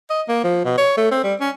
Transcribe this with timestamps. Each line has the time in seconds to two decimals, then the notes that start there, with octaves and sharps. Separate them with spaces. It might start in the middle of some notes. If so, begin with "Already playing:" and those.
0.10 D#5
0.29 A#3
0.44 F3
0.65 B2
0.78 C#5
0.97 A3
1.12 C4
1.24 G3
1.41 C#4